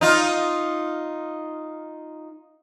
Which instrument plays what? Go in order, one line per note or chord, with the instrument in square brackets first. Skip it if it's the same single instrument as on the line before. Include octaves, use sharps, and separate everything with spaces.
[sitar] D#4 F4